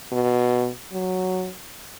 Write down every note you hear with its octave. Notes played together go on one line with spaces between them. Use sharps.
B2
F#3